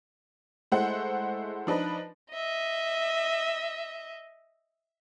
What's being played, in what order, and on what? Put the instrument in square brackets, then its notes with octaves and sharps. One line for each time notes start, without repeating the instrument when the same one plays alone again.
[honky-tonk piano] G#3 A3 E4 C5 F#5
F3 D4 D#4 B4
[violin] D#5 E5